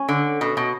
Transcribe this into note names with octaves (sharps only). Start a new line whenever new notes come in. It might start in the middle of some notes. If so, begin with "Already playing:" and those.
Already playing: C#4
D3
B2
B2